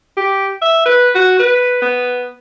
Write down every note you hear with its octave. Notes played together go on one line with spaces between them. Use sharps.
G4
E5
B4
F#4
B4
B3